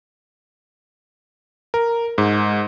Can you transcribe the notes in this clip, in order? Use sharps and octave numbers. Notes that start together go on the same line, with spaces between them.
A#4
G#2